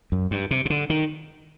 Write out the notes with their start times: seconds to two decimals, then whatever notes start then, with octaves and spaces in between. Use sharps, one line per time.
0.12 F#2
0.31 G2
0.51 C3
0.65 C3
0.70 D3
0.90 D#3